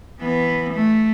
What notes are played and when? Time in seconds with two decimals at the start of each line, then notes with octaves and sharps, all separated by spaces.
0.20 E3 B3
0.74 A3